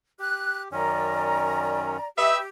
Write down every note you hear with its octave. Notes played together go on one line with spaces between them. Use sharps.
G4 F#6
F#2 D#3 C#4 D5 A#5
G4 B4 D#5 E5